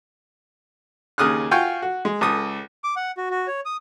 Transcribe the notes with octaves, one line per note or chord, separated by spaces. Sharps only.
D#2 C#3 D#6 F6 F#6
F4 F#4 G5 G#5 C#6
F#4
G#3
C#2 A4 D#6
D6
F#5
F#4
F#4
C#5
D#6